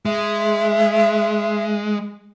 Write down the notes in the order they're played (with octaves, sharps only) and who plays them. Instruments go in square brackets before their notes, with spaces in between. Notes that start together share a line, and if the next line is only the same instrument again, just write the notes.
[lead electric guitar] G#3 [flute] E5